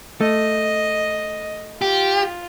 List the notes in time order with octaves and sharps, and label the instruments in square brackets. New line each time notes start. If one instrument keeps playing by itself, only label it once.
[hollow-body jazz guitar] A3 [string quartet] D#5
[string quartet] F4 [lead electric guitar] G4